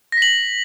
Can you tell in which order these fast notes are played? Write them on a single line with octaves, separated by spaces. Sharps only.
A#6 B6 F#7